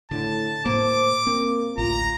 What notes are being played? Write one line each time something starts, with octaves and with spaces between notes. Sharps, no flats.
A2 D3 A5
A2 A#3 C5 D6
A#3 C4
A1 D2 F4 A#5